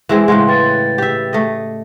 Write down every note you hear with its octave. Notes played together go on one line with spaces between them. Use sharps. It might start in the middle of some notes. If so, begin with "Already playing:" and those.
E3 G#3 C4
A2 C#3 G#3 F#5 C6 F#6
B4 G5 A6
G4 E5
A3 D#5